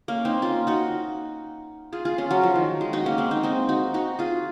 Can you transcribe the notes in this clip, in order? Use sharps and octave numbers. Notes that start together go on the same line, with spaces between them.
A#3 C#4
C4 D#4
C#4 F4
D#4 F#4
F4 G#4
F4 G#4
C#4 F4
F#3
F3
D#3
G#3
D#4 F#4
A#3 C#4
G#3 C4
C4 D#4
C4 D#4
D#4 F#4
D#4 F#4
F4 G#4